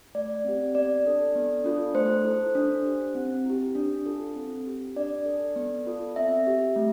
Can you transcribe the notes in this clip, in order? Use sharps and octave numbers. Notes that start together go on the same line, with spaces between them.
A3 D5
C4 G4
B3 D5
D4 A4
B3
D4 F4 A4
A3 C5
E4 A4
D4
G4
C4
E4 G4
D4
F4 A4
C4
G4
D4 D5
A4
B3
F4 A4
C4 E5
G4
A3